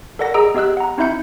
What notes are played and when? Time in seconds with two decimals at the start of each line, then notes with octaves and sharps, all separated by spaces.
0.19 A4 A#4 D5 F#5 A#6
0.34 G#4 D#5 A#5 D#6 E6 D7
0.54 B3 G4 D#5 E6 F#6
0.77 F#5 A#5
0.98 C4 D#4 E4 E5 G6 C#7